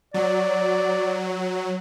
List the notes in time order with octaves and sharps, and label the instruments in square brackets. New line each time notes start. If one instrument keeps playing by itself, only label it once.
[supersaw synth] F#3 [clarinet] D5